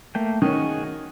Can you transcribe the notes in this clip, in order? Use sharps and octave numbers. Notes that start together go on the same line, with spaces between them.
A3 A#3 G5
D#3 C#4 F#4 G#4 D#5